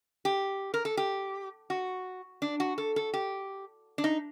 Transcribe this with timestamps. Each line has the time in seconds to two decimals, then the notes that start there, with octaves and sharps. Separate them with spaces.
0.25 G4
0.74 A#4
0.85 A4
0.97 G4
1.70 F#4
2.42 D4
2.60 F#4
2.78 A4
2.96 A4
3.14 G4
3.98 D4
4.04 D#4